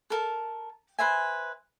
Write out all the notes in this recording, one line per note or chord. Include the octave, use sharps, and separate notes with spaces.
A4 A#4 A5
B4 C5 E5 G#5